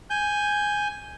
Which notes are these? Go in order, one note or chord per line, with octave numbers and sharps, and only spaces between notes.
G#5 G6